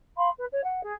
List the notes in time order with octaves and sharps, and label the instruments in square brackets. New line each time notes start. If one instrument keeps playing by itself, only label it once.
[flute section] F5 B5 C6
B4
C#5
F#5
G#4